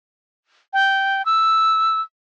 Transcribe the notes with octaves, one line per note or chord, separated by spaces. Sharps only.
G5
E6